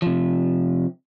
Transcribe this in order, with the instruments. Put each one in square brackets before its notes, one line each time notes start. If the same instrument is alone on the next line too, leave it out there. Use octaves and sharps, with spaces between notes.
[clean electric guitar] C3 F3